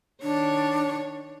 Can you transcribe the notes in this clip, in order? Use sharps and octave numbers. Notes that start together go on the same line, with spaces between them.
D#3 D4 C#5